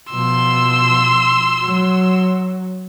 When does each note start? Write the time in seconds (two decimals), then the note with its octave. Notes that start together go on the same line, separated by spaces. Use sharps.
0.11 B2 F3 C6 E6
1.62 F#3